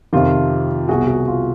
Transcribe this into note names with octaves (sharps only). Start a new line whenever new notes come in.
F2 C3 D#3 F4 G4
C2 B2 F#4 G#4
F#4
F4